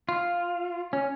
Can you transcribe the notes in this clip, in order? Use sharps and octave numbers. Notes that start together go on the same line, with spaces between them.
F4
C#4